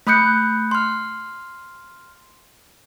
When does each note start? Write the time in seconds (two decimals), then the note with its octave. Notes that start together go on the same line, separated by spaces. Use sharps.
0.07 A3 B5 D#6 F#6 G6 C#7
0.71 C6 F6